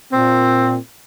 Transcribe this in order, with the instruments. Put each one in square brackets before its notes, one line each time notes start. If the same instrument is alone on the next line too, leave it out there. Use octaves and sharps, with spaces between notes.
[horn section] A#2 C4